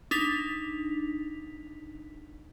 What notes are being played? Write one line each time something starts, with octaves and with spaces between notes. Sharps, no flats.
D4 D#4 B6 F7